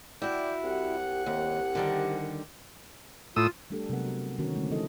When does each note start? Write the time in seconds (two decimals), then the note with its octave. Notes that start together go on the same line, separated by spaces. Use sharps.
0.22 E4 F#4 D5 G5
0.64 C2 G4 F#5
1.26 D#2 G4
1.75 D3 D#3 G3
3.36 A2 F4 D#6 E6
3.70 G3 A3 D4 G4 A4
3.89 C3 F#3 G#3 B3 A#4 F#5
4.05 F#4
4.38 D3 D#3 A#3 C#4 F#4 A#4
4.56 D3 G#3 A3 C4
4.70 F3 C4 E4 A4 D#5